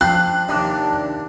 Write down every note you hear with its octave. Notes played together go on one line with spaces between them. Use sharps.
F3 D4 G5 F#6
D#2 C3 D4